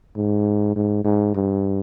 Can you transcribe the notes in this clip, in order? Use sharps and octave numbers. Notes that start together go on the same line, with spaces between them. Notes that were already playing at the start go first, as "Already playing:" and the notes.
G#2
G#2
G#2
G2